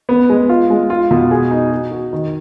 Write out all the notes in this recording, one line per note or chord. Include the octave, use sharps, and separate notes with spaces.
B3
G#3
F4
G#3
F4
B2
G#4
D#4
F#4
F#4
D#3